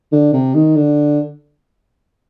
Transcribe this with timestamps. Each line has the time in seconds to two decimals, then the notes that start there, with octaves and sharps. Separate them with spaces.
0.12 D3
0.33 C3
0.55 D#3
0.76 D3